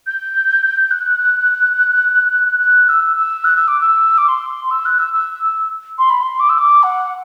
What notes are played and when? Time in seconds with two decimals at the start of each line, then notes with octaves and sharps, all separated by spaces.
0.07 G6
0.91 F#6
2.59 F#6
2.89 E6
3.16 E6
3.44 F#6
3.56 E6
3.68 D6
3.81 E6
4.18 D6
4.28 C6
4.71 E6
4.85 F#6
4.99 E6
5.13 E6
5.98 C6
6.10 B5
6.22 C6
6.40 D6
6.49 E6
6.58 D6
6.83 F#5